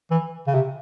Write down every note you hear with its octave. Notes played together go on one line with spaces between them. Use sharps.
E3
C#3
C3